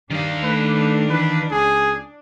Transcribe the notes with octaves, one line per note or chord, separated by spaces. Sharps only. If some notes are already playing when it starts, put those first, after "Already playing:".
G2 D#3 D4 F5
A3 B4
E3 B4
C#2 G#4